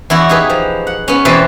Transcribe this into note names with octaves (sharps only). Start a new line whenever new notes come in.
E2 E4 F#4
D#4 G4 G#4 B4
F3
F#5
B3 C#4
E2 B2 E3 C4 B4 A5